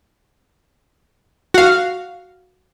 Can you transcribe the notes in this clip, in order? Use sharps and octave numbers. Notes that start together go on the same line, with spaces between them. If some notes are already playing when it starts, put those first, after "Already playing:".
F#4 F5